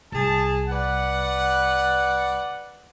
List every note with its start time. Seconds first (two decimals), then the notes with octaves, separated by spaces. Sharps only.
0.12 C2 G#4 A5
0.69 B4 D5 F#5